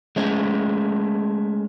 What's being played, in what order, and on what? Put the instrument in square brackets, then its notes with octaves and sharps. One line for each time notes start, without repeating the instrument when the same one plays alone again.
[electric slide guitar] G#3 A3 C#4